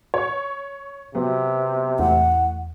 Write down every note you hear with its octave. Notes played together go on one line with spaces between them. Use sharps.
C#5 C#6
C3 F#3 B3
E2 A2 F#5